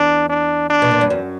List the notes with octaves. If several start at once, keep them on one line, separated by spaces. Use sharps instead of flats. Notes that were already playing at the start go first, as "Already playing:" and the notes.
Already playing: E2 D4
D4
D4
B2
A#2
G2
F#2